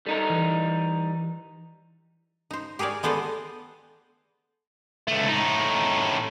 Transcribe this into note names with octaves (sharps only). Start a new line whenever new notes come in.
G3 D#4 A4 A#4
E3
D#4 C5
G4 G#4 A#4 C#5 D5
G#3 B3 A4 C5 D5 D#5
C#2 A3
A2 D#4